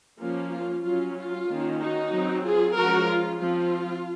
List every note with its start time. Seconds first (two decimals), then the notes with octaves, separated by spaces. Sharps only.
0.20 F3 A#3 C#4 F4
0.52 F4
0.84 F#3 C#4 F4
1.16 F4
1.48 D#3 A#3 C#4
1.80 D#4 F#4
2.13 F#3 C4
2.44 F4 G#4
2.76 F3 G#3 C#4 F#4 A#4
3.08 F4
3.40 F3 C4 F4